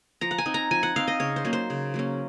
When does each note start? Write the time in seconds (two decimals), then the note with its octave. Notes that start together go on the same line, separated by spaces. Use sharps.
0.21 F3 A#5
0.31 F#5
0.38 G#5
0.46 C4 D#4
0.54 A#5
0.71 F3 G#5
0.83 F#5
0.96 C4 D#4 F5
1.08 D#5
1.20 C#3 C#5
1.36 C5
1.45 F#3 A#3 C#4
1.53 C5
1.70 C#3
1.94 F#3 A#3 C#4